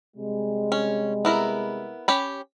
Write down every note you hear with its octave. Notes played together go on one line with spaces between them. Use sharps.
C3 G3 G#3
C#4
B3 E4 A#4
C#4 G4 B5